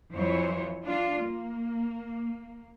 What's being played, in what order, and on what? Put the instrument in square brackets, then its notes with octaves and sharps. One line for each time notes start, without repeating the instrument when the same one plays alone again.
[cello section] F2 E3 F#3 E4 C5 C#5
D4 F4
A#3